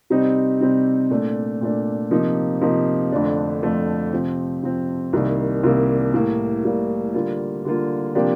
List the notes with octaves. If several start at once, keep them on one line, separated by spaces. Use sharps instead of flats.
C3 G3 C4 D#4
C3 G3 C4 D#4
A#2 A3 D4
A#2 A3 D4
C3 F3 A#3 D#4
C3 F3 A#3 D#4
F2 D3 F3 A3 D4
F2 D3 F3 A3 D4
C3 F3 C4
C3 F3 C4
C2 C3 D#3 G3 A#3
C2 C3 D#3 G3 A#3
A2 G3 A#3
A2 G3 A#3
D3 G3 A#3 F4
D3 G3 A#3 F4
C3 F3 A#3 D4 G4